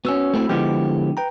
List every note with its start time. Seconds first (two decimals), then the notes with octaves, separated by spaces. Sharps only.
0.05 B3 C#4 F#4 E6
0.34 A3 C4 E4
0.49 D3 F3 G#3 B3 E4 G4
1.17 B4 G5 A#5